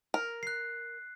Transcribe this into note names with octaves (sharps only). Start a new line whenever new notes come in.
A#4
F#6 C7